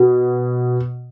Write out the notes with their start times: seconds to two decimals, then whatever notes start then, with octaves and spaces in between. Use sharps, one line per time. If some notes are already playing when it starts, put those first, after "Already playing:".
Already playing: B2